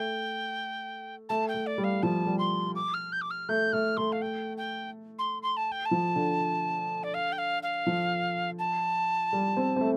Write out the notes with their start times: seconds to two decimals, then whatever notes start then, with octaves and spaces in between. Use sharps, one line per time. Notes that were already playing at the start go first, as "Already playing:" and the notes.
Already playing: A3 G5
1.29 A3 A5
1.48 G5
1.54 A3
1.67 D5
1.78 G3
1.84 F5
2.03 F3 A5
2.26 G3
2.39 C6
2.75 D6
2.94 F6
3.12 G6
3.21 D6
3.31 F6
3.49 A3 G6
3.73 A3 F6
3.97 A3 C6
4.12 F5
4.22 G5
4.57 G5
5.19 C6
5.43 C6
5.57 A5
5.72 G5
5.85 A5
5.91 F3
6.16 D3
7.04 D5
7.14 F5
7.32 G5
7.38 F5
7.63 F5
7.87 F3
8.59 A5
9.33 G3
9.57 C4
9.76 C4
9.81 A3